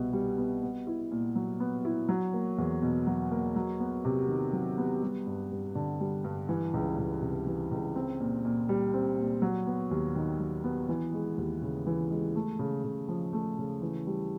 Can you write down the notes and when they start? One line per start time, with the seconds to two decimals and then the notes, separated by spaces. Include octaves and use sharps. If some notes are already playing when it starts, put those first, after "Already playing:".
Already playing: C2 B2 G3 B3
0.13 G3
0.38 B3
0.63 B3
0.87 E4
1.11 A#2
1.36 F#3
1.60 B3
1.85 E4
2.09 F#3
2.34 A#3
2.58 E2
2.82 B2
3.07 F#3
3.31 A#3
3.56 F#3
3.80 B3
4.05 C3
4.29 D#3
4.53 F#3
4.78 B3
5.03 G3
5.27 G2
5.51 G2
5.75 D3
6.00 G3
6.24 G2
6.49 E3
6.74 C#2
6.98 C#2
7.22 C3
7.47 E3
7.71 C#2
7.96 C4
8.20 A#2
8.45 A#2
8.69 G3
8.94 C4
9.18 A#2
9.42 F#3
9.67 B3
9.91 D#2
10.16 D#3
10.39 F#3
10.64 B3
10.89 E3
11.13 G#3
11.38 D#2
11.62 C#3
11.86 E3
12.10 G#3
12.36 A3
12.59 C#3
12.84 C#3
13.09 F3
13.33 A3
13.58 C#3
13.82 E3
14.07 G3